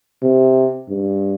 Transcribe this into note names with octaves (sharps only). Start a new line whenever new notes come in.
C3
G2